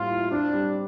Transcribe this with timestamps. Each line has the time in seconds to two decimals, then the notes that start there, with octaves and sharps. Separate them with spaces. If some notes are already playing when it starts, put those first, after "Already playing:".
Already playing: A2 G3 A#3 C4 F4
0.11 E4
0.31 C4 D4
0.54 G3